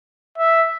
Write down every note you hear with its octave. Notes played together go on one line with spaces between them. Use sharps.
E5